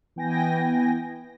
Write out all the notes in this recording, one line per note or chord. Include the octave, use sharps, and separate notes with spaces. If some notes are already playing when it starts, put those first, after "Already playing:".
E3 B3 G5 G#5 A#6